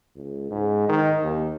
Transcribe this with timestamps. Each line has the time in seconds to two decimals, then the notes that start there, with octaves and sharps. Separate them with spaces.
0.16 C#2
0.51 G#2
0.89 D#3
1.23 D#2